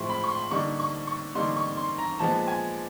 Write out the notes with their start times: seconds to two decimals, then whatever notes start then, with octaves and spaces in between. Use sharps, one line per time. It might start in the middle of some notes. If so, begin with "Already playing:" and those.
Already playing: A2 F3 G#3 C4 E4 C6 C#6
0.09 B5
0.24 C#6
0.30 C6
0.51 D3 G3 A#3 D#4 C#6
0.80 C#6
1.07 C#6
1.35 D3 G3 A#3 D#4 C6
1.57 C#6
1.77 C6
1.98 A#5
2.19 A#2 F3 G#3 B3 A5
2.47 G#5